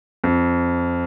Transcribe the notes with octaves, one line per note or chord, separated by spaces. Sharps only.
F2